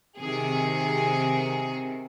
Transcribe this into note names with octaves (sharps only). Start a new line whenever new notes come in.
C3 D#3 G#4